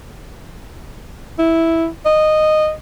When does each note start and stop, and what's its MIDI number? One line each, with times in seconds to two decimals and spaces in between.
1.39 1.87 64
2.06 2.72 75